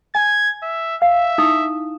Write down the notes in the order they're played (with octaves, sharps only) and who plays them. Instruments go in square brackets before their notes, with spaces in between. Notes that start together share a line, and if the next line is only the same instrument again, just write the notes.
[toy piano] G#5 [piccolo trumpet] G#6
[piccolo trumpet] E5
[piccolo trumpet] E5 [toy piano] F5
[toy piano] D#4 E4 D#6